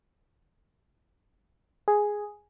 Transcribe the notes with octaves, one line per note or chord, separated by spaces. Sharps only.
G#4